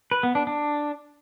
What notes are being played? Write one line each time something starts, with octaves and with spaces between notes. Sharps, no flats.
B4
B3
D4
D4